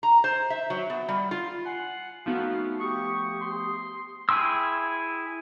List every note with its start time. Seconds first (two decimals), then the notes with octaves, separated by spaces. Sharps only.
0.03 A#5
0.24 C5
0.50 E5
0.70 F#3
0.90 B3
1.09 G3
1.31 F4
1.66 F#5 G#5 C7
2.26 F3 A3 B3 D#4 F#4 F5
2.80 G4 C#6 D#6
3.41 C6
4.29 E4 G#4 G5 C6 E6